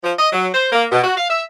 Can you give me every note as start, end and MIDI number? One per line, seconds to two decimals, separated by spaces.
0.03 0.13 53
0.19 0.30 75
0.33 0.48 54
0.54 0.69 72
0.72 0.84 58
0.91 1.02 47
1.04 1.15 66
1.18 1.28 77
1.29 1.42 76